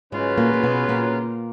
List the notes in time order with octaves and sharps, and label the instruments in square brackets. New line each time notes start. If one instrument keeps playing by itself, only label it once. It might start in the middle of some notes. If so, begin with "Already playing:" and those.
[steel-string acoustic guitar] G#2 G#3 [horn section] C#3 F#3 C#4 F4 B4
[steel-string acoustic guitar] A#2 A#3
A#3
B2 B3
A#2 A#3